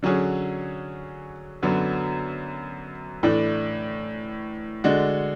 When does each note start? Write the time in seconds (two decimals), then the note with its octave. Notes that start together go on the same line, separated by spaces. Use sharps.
0.03 D3 F#3 C#4 G#4
1.62 F#2 D3 F#3 B3
3.23 A2 E3 A3 D4
4.84 D3 G#3 D4 F#4